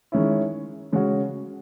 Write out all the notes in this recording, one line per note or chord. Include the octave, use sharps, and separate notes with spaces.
D#3 G#3 C#4 E4
C#3 G#3 C#4 F#4